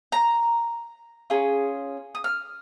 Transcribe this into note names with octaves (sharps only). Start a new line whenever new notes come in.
A#5
C#4 F4 G#4
D#6
F6